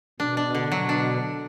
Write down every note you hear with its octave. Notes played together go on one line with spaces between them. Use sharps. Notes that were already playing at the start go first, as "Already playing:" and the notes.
B2 D4
D4
D3
B2 F#3
D4